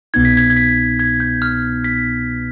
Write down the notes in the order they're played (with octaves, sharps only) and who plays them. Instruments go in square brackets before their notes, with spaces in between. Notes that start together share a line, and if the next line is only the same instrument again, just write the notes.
[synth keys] C2 B2 B3 D#4 [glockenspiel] G#6
[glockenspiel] B6
G#6
G#6
B6
G#6
G6
F6
B6